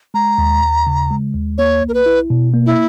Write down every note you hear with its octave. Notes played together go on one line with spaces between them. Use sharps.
G#3 A#5
D#2
D#2
C#3
G#3
D#2
A#3 C#5
B1
A#4
B4
E4
B2
A#3
E4